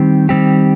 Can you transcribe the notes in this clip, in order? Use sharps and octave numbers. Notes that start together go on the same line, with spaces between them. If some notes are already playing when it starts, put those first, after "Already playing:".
Already playing: D#3 G3 C4 G4
D#3 G3 C4 G4